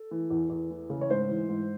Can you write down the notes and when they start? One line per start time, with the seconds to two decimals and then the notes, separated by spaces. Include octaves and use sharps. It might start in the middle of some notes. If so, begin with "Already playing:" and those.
Already playing: A4
0.11 E3
0.30 E2
0.50 E2
0.71 E3
0.90 C#3
1.01 C#5
1.10 G#2 C5
1.29 E3
1.49 G#2